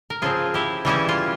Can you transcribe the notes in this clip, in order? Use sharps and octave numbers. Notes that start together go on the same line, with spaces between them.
A#4
C#3 F3 C4 F4 G#4
E4 G4
C#3 E3 G3 C#4 E4
F4